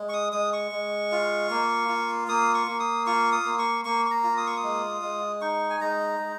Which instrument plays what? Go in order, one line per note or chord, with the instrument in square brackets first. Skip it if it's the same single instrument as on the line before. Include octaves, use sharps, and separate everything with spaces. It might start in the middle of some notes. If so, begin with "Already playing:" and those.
Already playing: [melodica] G#3
C#6
D#6
G#3 D#6
C#6
G#3
F4
A#3
F4
A#3 D#6
C#6
A#3
D#6
F4 C#6
D#6
A#3
C#6
A#3 C#6
C#6
A#5
F4
D#6
C#6
D#6
G#3
G#3
D#4 C#6
G#5
G#3 A#5
G#3